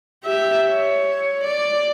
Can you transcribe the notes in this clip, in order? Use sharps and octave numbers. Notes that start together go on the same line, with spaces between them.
G4 E5
C#5
D5